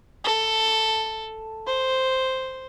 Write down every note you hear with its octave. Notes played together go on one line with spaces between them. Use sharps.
A4
C5